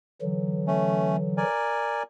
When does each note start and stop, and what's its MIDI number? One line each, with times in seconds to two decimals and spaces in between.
0.22 1.43 50
0.22 1.43 52
0.22 1.43 54
0.67 1.17 57
0.67 1.17 61
1.37 2.03 70
1.37 2.03 74
1.37 2.03 80